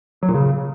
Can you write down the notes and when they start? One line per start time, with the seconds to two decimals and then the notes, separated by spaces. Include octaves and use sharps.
0.23 F#3
0.29 A#2
0.34 C#3